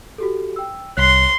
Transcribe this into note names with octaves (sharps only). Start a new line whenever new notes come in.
F#4 G4 A4
G5 E6
C2 C#5 C6 F#6 B6 C7